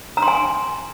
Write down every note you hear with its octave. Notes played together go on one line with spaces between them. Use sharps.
A#5
C6
G#5